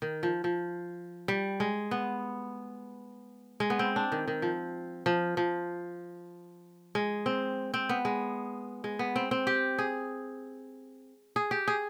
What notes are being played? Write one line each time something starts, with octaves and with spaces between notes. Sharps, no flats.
D#3
F3
F3
G3
G#3
B3
G#3
B3
C4
D4
D#3
D#3
F3
F3
F3
G#3
C4
C4
B3
G#3
G#3
B3
C4
C4
G4
G#4
G#4
G4
G#4